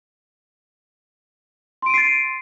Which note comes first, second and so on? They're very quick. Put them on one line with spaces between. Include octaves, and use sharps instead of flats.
C6 D7 D#7 C7 A6